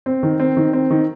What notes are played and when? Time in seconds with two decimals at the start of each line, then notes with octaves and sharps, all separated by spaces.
0.06 C4
0.23 D#3
0.40 C4
0.57 D#3
0.73 C4
0.91 D#3